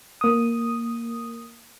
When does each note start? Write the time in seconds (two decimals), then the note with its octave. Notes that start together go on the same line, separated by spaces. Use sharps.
0.21 A#3 D#6